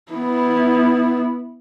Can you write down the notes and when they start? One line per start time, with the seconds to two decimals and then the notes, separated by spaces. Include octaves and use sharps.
0.12 B3 E4